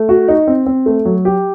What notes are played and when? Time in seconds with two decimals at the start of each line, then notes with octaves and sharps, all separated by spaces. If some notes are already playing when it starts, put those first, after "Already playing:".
Already playing: A3
0.09 F#4
0.28 D#4
0.47 C4
0.66 C4
0.86 A3
1.05 F#3
1.25 G4